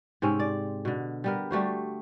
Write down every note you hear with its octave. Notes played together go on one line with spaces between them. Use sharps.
G#2 C3 C4 C#4
D5
B2 D3
G3 B3 A#4
G3 A3 F#4 C5